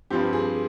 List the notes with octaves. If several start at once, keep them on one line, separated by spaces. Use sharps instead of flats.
G2 F3 C4 G4
G#4